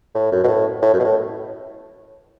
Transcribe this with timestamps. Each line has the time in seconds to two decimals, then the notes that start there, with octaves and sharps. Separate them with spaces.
0.14 A2
0.32 F#2
0.44 B2
0.48 A2
0.82 A2
0.94 F#2
0.99 B2
1.04 A2